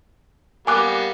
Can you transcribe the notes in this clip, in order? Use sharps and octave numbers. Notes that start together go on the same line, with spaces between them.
G3 A#3 B3 G#5 D6 F#6